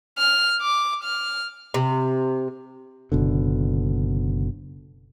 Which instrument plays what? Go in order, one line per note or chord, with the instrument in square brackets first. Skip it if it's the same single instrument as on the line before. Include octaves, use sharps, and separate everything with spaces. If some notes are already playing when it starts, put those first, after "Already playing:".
[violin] F6
D6
F6
[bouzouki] C3
[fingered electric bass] F#1 B2 D3